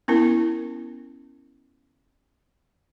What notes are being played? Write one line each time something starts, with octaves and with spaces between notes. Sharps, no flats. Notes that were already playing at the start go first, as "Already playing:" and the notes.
B3 C#4 E4 A#4